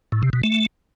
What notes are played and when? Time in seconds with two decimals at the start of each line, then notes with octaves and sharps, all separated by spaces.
0.12 A2
0.23 C3
0.33 B2
0.43 A3